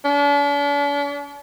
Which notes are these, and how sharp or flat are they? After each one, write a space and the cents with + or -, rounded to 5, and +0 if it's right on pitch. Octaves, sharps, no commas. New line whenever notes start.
D4 -45